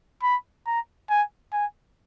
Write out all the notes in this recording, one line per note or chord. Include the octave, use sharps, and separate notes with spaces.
B5
A#5
G#5
G#5